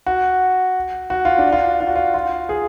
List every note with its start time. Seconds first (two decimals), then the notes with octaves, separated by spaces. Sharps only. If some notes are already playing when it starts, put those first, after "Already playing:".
0.06 F#4
1.10 F#4
1.25 F4
1.38 D4
1.52 F4
1.80 F4
1.87 F#4
1.96 F4
2.14 F4
2.49 G#4